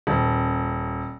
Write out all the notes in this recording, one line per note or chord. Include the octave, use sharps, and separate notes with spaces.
D#1